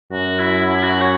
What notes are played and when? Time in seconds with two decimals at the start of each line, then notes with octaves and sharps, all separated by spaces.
0.12 F#2 F#4
0.39 E4
0.65 E4
0.77 E4
0.83 F#4
1.01 C#5